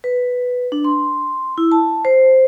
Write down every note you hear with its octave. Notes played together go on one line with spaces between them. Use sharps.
B4
D4
C6
E4
A5
C5